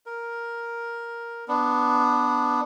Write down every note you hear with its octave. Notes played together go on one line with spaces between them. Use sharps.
A#4
B3 D4